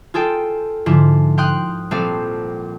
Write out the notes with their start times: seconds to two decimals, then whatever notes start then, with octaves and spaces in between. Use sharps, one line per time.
0.14 F4 G#4 A4 G5
0.86 G#2 D3 F3 E4 F4
1.38 F5 G5 C6 D#6 F#6
1.91 A#1 G3 C4 A4 F5